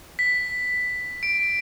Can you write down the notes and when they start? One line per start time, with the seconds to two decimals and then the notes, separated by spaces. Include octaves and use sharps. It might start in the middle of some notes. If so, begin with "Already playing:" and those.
0.19 B6
1.23 D7